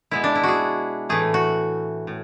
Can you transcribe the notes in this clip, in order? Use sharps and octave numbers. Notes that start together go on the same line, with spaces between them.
B2 G#3 B3 E4
D4
E4
F#4 G#4
A2 E3 A3 G#4
F#4
A2